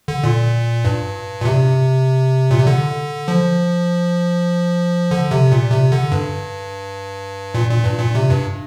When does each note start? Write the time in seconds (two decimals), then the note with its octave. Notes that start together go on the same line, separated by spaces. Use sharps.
0.08 D3
0.24 A#2
0.85 G2
1.41 A#2
1.45 C3
2.51 A#2
2.59 C3
2.67 D3
3.28 F3
5.11 D3
5.31 C3
5.52 A#2
5.71 C3
5.92 D3
6.12 G2
7.54 A#2
7.70 A#2
7.85 G2
7.99 A#2
8.15 C3
8.30 G2